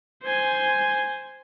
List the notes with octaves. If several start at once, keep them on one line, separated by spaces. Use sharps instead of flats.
C5 G#5